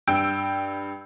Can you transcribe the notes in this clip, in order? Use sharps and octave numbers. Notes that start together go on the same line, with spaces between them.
G2 G5 E6 G6 D7